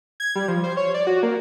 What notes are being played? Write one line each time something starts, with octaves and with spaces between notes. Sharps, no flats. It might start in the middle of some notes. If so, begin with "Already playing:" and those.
G#6
G3
F3
C5
C#5
D5
F#4
A#3